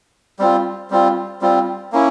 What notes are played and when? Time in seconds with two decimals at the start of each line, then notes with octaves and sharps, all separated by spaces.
0.39 G3 C4 F4
0.90 G3 C4 F4
1.41 G3 C4 F4
1.92 A#3 C#4 E4